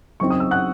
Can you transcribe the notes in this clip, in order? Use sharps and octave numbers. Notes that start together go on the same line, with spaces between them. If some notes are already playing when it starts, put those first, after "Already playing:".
C#3 F#3 C4 D#4 C#6
D#6
E6
F#5 F#6